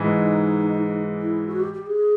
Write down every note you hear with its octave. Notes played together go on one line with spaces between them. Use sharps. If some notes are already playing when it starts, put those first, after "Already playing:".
Already playing: G#2 E3 G#3
D#4
E4
F#4
G4
G4
G#4